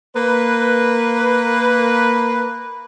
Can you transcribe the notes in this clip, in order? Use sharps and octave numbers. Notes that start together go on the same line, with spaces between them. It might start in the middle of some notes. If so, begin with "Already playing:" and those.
A#3 B4